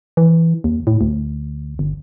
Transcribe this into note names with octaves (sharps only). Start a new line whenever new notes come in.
E3
D#2
A2
D2
G1